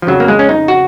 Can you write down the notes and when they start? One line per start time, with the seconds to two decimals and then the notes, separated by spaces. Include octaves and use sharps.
0.02 F3
0.07 F2 C#3 F#3
0.20 A#3
0.28 G#3
0.39 C#4
0.49 D#4
0.68 F#4